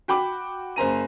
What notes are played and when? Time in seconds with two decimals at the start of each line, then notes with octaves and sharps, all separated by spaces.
0.08 F#4 G5 B5 D6
0.76 F#1 C5 A#5 D#7